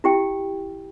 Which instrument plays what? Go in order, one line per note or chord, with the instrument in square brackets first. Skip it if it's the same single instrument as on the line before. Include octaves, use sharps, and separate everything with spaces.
[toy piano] E4 G4 G5